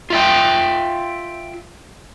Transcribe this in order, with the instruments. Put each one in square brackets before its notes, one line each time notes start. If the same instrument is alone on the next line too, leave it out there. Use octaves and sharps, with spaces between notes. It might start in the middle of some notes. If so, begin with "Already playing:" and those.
[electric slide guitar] F4 E5 G5